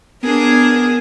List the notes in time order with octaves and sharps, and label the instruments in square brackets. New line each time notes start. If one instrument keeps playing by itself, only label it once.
[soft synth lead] B3 [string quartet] D4 G#4 A#4